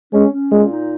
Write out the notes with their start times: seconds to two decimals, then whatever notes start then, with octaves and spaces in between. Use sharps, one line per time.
0.13 G#3 C#4
0.32 C#4
0.52 A#2 G#3
0.71 D#4